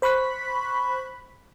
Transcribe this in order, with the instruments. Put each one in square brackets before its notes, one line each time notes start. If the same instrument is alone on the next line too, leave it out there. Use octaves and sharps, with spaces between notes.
[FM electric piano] C5 B5 C#6 F#6 B6